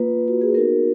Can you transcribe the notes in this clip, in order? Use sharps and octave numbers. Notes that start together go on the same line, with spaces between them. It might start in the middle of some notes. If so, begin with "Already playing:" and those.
Already playing: A#3 F4 B4
F#4
G#4
B3 D#4 F#4 A#4